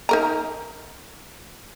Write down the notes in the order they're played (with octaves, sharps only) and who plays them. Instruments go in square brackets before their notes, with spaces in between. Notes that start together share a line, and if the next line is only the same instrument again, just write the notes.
[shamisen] D#4 A#4 A#5